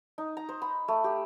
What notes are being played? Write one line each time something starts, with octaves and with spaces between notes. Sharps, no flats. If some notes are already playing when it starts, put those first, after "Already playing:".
D#4
A#5
C5
B5
A3
G4